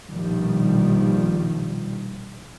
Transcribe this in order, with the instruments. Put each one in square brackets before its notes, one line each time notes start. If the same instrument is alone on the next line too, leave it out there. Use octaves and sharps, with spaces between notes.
[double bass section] A#1 B2 D#3 F3 G3